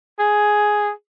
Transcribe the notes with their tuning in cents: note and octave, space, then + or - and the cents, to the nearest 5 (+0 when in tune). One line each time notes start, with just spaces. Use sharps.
G#4 +5